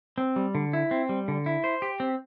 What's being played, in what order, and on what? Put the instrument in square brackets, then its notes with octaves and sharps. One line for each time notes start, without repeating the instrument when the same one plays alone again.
[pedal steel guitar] C4
G3
D3
E4
C4
G3
D3
E4
C5
G4
C4